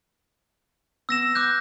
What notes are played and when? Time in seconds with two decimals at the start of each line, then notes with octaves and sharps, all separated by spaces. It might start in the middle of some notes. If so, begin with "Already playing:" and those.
1.09 B3 E6 A#6 E7
1.35 D6 F#6 G6